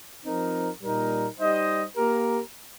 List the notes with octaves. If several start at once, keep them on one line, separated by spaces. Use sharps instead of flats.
F3 C4 D#4 A#4
A#2 G3 D#4 A#4
G3 D#4 C5 D#5
A#3 G4 A#4